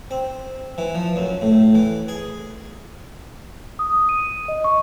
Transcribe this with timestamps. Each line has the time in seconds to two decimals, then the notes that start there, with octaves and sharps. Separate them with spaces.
0.11 C4
0.78 E3
0.95 F3
1.16 F#2
1.41 A2
1.75 E3
2.08 G#4
3.79 D#6
4.09 D#7
4.48 D#5
4.64 C#6